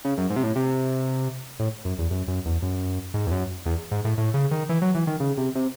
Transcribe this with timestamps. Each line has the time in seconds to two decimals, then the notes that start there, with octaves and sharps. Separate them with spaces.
0.05 C#3
0.18 F#2
0.30 G#2
0.36 C3
0.43 A2
0.56 C3
1.59 A2
1.85 F#2
1.98 E2
2.11 F#2
2.28 F#2
2.46 E2
2.62 F#2
3.14 G#2
3.27 E2
3.31 F#2
3.66 E2
3.91 G#2
4.05 A2
4.18 A2
4.34 C#3
4.51 D#3
4.69 E3
4.82 F#3
4.95 E3
5.07 D#3
5.20 C#3
5.37 C3
5.55 C3